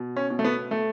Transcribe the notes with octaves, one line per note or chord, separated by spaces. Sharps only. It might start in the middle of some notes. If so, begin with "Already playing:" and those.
Already playing: B2
C#4
B2
A3
B3
A3